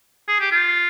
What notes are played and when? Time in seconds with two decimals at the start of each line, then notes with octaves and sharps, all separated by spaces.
0.28 G#4
0.40 G4
0.51 F4